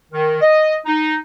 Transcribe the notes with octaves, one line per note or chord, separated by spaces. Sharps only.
D#3
D#5
D#4